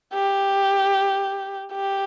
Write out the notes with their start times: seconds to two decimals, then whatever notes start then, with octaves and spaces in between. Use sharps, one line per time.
0.14 G4
1.73 G4